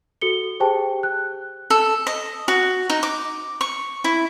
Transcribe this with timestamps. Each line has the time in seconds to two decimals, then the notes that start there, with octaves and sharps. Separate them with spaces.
0.21 F#4 A4 C#7 G7
0.60 G4 G#4 C5 G5 A5
1.03 F#6
1.70 A4
2.07 D#5
2.48 F#4
2.90 D#4
3.03 D6
3.61 C#6
4.04 E4